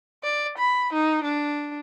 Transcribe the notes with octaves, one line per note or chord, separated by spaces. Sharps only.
D5
B5
D#4
D4